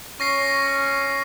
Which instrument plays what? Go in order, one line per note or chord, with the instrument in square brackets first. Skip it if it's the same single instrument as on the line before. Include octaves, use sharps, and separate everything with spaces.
[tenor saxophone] C#4 [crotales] C#6 A#6 C7